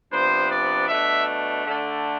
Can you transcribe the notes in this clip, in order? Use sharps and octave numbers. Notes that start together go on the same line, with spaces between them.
C3 F3 B3 D4 C5
D5
B2 A3 D4 E5
D3 A3 D4